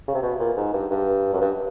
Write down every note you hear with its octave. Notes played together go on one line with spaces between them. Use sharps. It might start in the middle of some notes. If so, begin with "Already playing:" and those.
C#3
C3
B2
A#2
G#2
G2
G2
F#2
G2